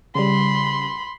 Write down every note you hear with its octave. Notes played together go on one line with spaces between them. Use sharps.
C#3 G3 B5 C6